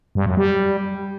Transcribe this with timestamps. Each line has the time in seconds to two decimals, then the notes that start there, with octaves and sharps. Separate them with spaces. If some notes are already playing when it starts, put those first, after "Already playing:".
0.15 G2
0.26 F#2
0.37 G3